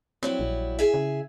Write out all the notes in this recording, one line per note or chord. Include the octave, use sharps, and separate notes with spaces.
F#3 G3 C4 E4
A#1
G#4 E5
C#3